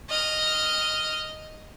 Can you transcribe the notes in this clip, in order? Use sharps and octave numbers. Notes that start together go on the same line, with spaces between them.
D#5 F6